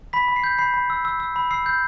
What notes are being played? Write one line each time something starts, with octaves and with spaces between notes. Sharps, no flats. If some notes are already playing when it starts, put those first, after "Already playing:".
B5 B6
B5
C7
G6
B5 C7
B5
E6
E6
E6
B5
E6 C7
G6